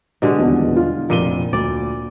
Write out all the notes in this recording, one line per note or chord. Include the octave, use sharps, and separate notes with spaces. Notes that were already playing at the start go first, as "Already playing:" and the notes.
B2 D3 G#3 G4
D#1 E2
F4
F1 A#2 D#7 G7
D2 D5